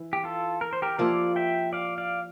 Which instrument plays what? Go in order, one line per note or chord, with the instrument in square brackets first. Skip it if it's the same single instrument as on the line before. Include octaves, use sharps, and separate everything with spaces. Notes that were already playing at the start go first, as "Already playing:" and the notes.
Already playing: [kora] E3 E4
[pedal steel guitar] G4
F4 A4
A#4
C5
G4 A#4
[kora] F3 A#3 E4 G4 [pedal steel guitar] D5 F5
[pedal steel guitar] E5 G5
D5 F5
D5 F5